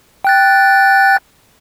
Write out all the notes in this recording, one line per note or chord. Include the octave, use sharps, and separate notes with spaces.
G5 F#6 A6